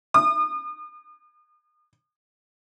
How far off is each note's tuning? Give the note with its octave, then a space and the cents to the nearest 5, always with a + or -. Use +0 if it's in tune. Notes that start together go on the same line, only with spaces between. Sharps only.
D#6 -45